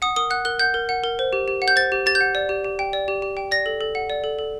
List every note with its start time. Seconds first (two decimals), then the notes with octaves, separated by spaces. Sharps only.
0.02 F#5 D#6
0.16 A#4 D#6
0.30 F#5 F#6
0.45 A#4 F#6
0.60 F#5 G6
0.74 A#4
0.89 F#5
1.04 A#4
1.19 C5
1.33 G4
1.48 G4
1.62 F#5
1.68 G6
1.76 C5 A6
1.92 G4
2.06 G4 A6
2.15 G6
2.21 F#5
2.35 D5
2.49 G4
2.64 G4
2.79 G5
2.93 D5
3.08 G4
3.22 G4
3.37 G5
3.51 D5 A#6
3.66 A4
3.81 A4
3.95 F#5
4.10 D5
4.24 A4
4.39 A4